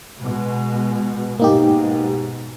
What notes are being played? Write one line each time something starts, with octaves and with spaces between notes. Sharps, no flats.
B2 G#3
G#2 B2 A#3 D#4 G4